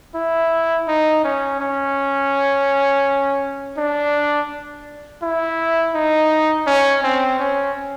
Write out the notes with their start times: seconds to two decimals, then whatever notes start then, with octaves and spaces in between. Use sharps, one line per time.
0.15 E4
0.88 D#4
1.24 C#4
1.60 C#4
3.77 D4
5.22 E4
5.94 D#4
6.67 C#4
7.04 C4
7.40 C#4